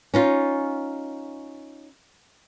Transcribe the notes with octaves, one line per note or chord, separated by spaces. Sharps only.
C#4 D#4 F4